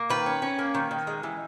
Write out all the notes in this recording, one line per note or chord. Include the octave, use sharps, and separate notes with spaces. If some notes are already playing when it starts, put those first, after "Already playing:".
Already playing: A#3
D#3 B4
C#4
C#4
A#3
D#3
D#3
G#3
E3